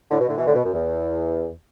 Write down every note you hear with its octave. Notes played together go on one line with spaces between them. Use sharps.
A2 D3
B2
A2 D3
B2 E3
A2 D3
B2
F#2
E2